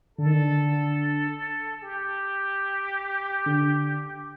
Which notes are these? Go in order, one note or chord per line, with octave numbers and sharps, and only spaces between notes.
D3 A4
D#3
D3
G4
D3